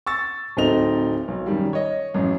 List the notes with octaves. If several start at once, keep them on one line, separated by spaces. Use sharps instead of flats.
C#6 E6 A6
D1 A3 C4 D#4 F7
B1
F#2 D#3 G3
C#5 D#5
A1 F#2